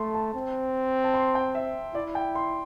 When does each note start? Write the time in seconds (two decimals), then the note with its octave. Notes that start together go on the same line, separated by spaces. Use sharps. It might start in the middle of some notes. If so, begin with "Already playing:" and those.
Already playing: A3 A5 C6
0.14 A5
0.34 C4
1.04 A5
1.14 C6
1.35 G5
1.55 E5
1.95 E4 D5
2.15 G5
2.35 C6